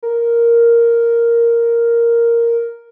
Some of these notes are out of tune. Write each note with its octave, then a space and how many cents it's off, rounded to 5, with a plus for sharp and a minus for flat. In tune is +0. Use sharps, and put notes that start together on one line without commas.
A#4 +0